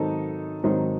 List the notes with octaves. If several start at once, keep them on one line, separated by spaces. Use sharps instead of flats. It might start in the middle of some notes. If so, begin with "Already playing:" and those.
Already playing: G#2 D#3 F#3 C4 D#4 A4
G#2 D#3 F#3 C4 D#4